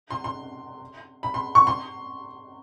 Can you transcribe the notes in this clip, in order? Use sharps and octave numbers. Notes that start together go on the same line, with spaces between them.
C6
C6
B5
C6
C#6
C6